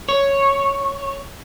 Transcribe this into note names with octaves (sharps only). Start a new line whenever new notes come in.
C#5